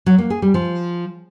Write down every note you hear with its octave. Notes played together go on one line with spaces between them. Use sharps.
F#3
A#3
G#4
G3
F3